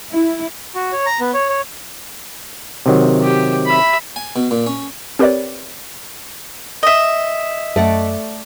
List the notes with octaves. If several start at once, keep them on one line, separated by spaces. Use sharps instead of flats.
E4
F#4
C#5
A#5
B3
C#5
C#5
C3 D#3 F#3
G4
E5 B5
G#5
B2
A#2
C#4
C4 G4 A#4 B4 C#5 D5
D#5 E5
F#2 A3 D5 F#5